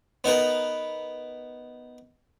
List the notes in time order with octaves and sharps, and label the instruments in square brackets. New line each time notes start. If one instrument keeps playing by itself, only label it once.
[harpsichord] B3 D#4 A#4 B4